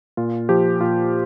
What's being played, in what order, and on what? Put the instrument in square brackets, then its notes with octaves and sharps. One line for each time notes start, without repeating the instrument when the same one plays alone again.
[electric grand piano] A#2 F4
F3 G4
A#2 F4